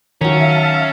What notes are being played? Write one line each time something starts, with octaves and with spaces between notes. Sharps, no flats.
D#3 F#3 C#4 E5 F5 A5 A#5